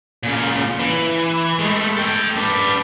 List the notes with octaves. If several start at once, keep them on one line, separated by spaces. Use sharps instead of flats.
A#2 C#3
E3
G#3 A3
A4 G5
D4 B4